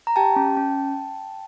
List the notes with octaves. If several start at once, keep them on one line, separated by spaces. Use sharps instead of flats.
A#5
G4 G5 A5
C#4
C#4